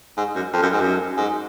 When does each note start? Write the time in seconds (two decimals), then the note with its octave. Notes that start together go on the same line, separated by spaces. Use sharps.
0.17 G#2
0.35 F#2
0.53 F2
0.62 F#2
0.73 G#2
0.81 F#2
1.17 G#2